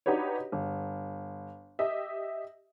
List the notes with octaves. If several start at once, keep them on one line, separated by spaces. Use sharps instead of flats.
D4 D#4 F#4 G4 B4 C#5
G1
G4 D#5 E5